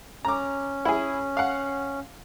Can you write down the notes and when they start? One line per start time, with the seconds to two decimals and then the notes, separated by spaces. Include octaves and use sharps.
0.25 C#4 A#5 D6
0.85 E4 G#4
1.37 F5 F#5